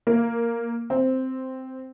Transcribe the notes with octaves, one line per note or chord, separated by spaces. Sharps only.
A#3
C4